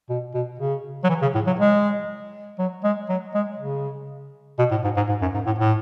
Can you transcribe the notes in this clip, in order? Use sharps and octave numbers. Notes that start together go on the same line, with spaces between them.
B2
B2
C#3
F#3
E3
C#3
A2
F#3
G#3
F#3
G#3
F#3
G#3
C#3
B2
A2
G#2
G#2
G#2
F#2
G#2
A2
A2